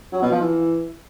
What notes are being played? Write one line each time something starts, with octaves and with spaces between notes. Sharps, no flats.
F#3
B2
F3
E3